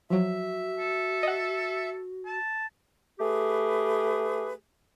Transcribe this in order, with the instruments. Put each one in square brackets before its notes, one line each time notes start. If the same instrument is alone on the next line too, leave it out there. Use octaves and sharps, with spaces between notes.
[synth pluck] F3 F#3 [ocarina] F#4 [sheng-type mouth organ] E5
[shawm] A4
[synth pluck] D#5 F#5
[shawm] A5
[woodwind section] A3 G4 G#4 B4